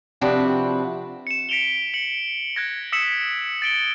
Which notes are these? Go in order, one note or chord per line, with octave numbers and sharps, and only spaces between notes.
C3 F3 C4 D4 F#4 B4
C#7 E7
B6 C#7 D7 E7 F7 G7
C#7 F#7
F#6 G#6 A#6 F#7
D#6 E6 B6 C#7 E7 F#7
A6 D7 G7